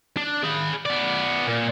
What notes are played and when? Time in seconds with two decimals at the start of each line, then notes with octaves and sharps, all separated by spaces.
0.17 D4
0.44 G#4 B5
0.86 B3 D5
1.47 A#2